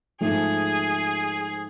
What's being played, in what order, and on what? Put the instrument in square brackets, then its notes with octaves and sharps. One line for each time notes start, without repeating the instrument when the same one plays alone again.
[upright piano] G#2 F3 A3 [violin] G#4